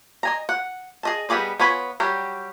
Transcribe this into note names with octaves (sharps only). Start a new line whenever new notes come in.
D#5 G#5 A#5
F#5
G#4 D#5 A5
G3 B3 G#4 D5 D#5
B3 F4 C#5 G#5 B5
F#3 G3 G4